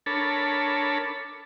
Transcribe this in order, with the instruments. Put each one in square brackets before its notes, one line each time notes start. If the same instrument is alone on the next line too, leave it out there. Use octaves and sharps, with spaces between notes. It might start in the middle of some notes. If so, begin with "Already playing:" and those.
[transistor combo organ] D4 A4 A#4 C#5 A5 B5